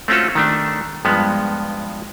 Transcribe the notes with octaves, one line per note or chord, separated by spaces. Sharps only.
A3 C4 C#4 F4 F#4 A4
D#3 A3 D4
G2 F3 G#3 B3